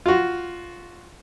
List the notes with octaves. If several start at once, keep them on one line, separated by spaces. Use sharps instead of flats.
F4 F#4